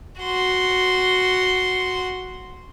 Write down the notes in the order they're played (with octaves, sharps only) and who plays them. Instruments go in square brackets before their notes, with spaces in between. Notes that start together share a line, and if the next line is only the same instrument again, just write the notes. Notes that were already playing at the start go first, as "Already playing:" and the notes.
[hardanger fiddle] F#4 C6